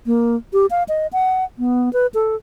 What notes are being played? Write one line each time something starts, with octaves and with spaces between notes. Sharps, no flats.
A#3
G4
F5
D#5
F#5
B3
B4
A4